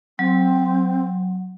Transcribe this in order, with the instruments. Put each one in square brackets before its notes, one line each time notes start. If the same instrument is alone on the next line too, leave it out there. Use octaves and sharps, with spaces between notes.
[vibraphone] F#3 [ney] C4